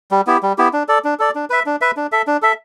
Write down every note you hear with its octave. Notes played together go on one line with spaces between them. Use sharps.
G3
B3 E4 G4
G3
B3 E4 G4
D4
A4 D5
D4
A4 D5
D4
B4 E5
D4
B4 E5
D4
A4 E5
D4
A4 E5